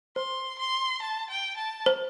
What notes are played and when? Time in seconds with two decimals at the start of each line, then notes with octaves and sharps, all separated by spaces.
0.16 C5 C6
0.58 C6
1.02 A5
1.30 G5
1.57 A5
1.86 C5